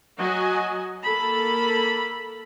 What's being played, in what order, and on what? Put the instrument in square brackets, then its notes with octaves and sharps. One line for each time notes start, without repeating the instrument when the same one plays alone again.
[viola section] F#3 F#4 D#5 G#5
A#3 A4 B5